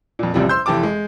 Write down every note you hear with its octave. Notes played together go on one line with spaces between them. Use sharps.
F2 A#2
A1 E2 C3 F3 G3
C5 C6 E6 G6
F1 E3 G4 A5 D6
G#3